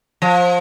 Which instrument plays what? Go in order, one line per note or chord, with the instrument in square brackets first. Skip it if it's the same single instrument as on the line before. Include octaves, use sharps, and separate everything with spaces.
[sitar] F3